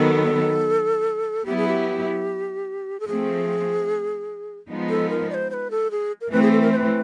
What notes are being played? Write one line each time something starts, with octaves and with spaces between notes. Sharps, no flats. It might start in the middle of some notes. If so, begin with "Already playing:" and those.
Already playing: D#3 F#3 B3 A4
F#3 B3 E4 G4
G#4
G4
A4
F3 A3 C4 G#4
F3 G#3 B3 D#4
A4
A#4
D5
C5
C5
B4
A4
G#4
A#4
E3 A3 C4 B4
G#4
A4
A#4
C5
B4